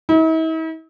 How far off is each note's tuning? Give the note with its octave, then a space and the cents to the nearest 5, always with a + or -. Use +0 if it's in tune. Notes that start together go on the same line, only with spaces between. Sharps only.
E4 -45